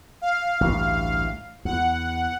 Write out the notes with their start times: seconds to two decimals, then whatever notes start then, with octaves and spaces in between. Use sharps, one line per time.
0.21 F5
0.61 A1 D2 G2
1.65 E2 F#5